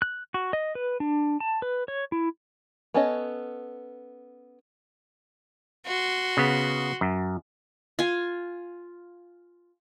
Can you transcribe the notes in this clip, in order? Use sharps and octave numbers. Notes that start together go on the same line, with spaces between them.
F#6
F#4
D#5
B4
D4
A5
B4
C#5
E4
B3 C#4 A4 C#5 D#5
F#4 C6
C#3 B3
F#2
F4 G#5